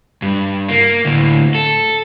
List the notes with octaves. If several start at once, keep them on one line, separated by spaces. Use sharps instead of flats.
G2
A#3
D2 A2
A4